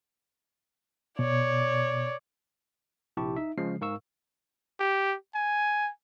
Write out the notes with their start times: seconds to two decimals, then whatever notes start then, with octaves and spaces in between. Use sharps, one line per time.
1.19 B2 C#5 D5
3.17 A#1 C3 E4 G4 A5 C#6
3.36 D#4 E5
3.58 C#3 F3 G#3 C7
3.81 G#2 A#4 F5 C#6 E6
4.80 G4
5.35 G#5